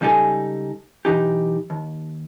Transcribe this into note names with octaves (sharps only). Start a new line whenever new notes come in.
C#2 G3 D#4 G4 A4 G#5
B1 E3 D#4 G4
D#2